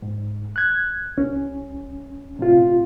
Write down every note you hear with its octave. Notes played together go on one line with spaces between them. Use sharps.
G#2
F#6 G#6
C2 C#4
A2 C3 F4